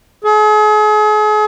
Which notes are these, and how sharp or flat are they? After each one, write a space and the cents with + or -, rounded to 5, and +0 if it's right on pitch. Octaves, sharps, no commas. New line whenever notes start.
G#4 +40